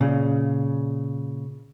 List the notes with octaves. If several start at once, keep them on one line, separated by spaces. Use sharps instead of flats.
A#2 C#3